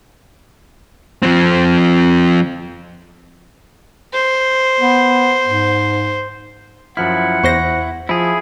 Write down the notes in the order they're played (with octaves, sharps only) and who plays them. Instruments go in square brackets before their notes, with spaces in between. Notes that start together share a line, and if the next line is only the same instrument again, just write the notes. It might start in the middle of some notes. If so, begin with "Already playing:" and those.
[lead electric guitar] F3 C4
[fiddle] C5
[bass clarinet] B3
G#2
[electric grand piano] F#2 F3 F6 [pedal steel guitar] E4 [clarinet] F#5
[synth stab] E2 C5 A#6 [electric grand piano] C#6
[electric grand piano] F3 [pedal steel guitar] E4 G#4